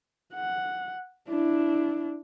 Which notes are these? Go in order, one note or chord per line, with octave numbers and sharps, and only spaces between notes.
F#5
D4 E4